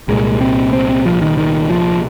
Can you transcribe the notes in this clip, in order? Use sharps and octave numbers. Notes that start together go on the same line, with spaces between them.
C2 A#2 G#3
C4
C4
C4
F3
D#3
D#3
F3